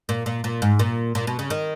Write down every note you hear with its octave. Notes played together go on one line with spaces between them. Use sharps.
A#2
A#2
A#2
G#2
A#2
A#2
B2
C#3
D#3